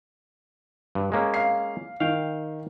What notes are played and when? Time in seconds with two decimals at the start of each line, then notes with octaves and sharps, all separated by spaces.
0.95 G2
1.12 G#3 A#3 C#4
1.34 F5 C7
2.00 D#3 F5 G5